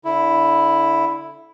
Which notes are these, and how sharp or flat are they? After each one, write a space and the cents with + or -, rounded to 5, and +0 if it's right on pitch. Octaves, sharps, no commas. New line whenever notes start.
D3 -20 E4 +0